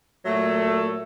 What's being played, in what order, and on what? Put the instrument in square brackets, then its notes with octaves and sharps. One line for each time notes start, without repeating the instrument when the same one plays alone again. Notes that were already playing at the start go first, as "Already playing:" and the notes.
[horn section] A#2 F#3 A3